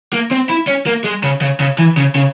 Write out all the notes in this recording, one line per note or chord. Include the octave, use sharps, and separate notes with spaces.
A#3
C4
E4
C#4
A#3
G#3
C#3
C#3
C#3
E3
C#3
C#3